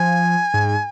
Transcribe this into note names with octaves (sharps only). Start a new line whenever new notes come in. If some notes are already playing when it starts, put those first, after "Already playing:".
Already playing: F3 G#5
G#2